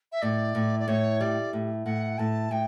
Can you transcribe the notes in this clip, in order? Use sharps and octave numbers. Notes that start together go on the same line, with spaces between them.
E5
A2 D5
A2
D5
A2 C#5
G3 D5
A2
A2 F#5
A2 A5
A2 G5